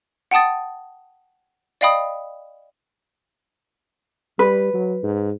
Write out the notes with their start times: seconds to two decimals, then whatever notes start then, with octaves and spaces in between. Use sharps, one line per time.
0.31 F#5 G5 A5 D#6 A6
1.81 D5 D#5 F5 G5 B5 D#6
4.39 G3 B4
4.74 F#3
5.03 G#2